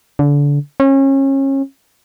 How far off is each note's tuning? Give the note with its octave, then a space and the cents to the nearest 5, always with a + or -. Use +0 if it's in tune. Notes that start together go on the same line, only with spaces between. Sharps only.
D3 -30
C#4 -30